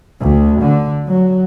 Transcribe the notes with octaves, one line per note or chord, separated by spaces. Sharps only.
D2
D3
F#3